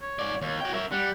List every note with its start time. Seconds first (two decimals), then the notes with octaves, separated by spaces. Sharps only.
0.01 C#5
0.19 G#2 D5
0.42 D#2 C#5
0.61 F#4 G5
0.73 A#4 E5
0.92 G3 F#5